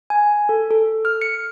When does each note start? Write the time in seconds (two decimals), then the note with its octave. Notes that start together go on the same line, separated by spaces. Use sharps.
0.10 G#5
0.49 A4
0.71 A4
1.05 F6
1.22 C#7